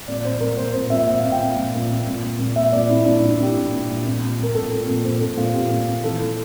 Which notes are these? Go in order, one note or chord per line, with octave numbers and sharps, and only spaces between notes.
A#2 D5
A#2 C5
A#2 A#4
A#2 C5
A#2 C5
A#2 E5
A#2 E5
A#2 F5
G5
A#2
A#2
A#2
A#2
A#2
A#2
A#2
A#2 E5
A#2 D5
A#2 E4
A#2 D4
A#2 E4
E4
A#2 G4
A#2
A#2
A#2
A#2
A#2
A#2 A#4
A#2 A4
A#2
A#2
A#2 C5
A#2 A4
A#2 F4
A#2 G4
A#2
A#2
E3 A4
E3